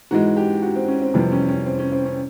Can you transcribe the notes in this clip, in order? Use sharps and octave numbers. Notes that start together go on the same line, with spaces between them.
G#2 E3 G#3 F#4
G4
F#4
C4
C#4
C4
F2 C3 E3 G3 B3 C4
C#4
C#4
C4
C#4
C4
C#4